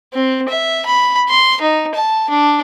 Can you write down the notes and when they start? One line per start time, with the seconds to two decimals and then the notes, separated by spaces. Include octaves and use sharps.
0.13 C4
0.49 E5
0.86 B5
1.29 C6
1.61 D#4
1.95 A5
2.30 D4